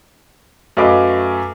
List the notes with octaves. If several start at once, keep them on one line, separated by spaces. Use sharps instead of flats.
F#2 A3 B4 D#5 F5 D6